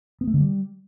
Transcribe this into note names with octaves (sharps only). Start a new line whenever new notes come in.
B3
A3
D3
G3